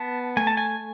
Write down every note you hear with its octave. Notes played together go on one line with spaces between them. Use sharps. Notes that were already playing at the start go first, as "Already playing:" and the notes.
Already playing: B3 A5
A3 G#5
A5
G#5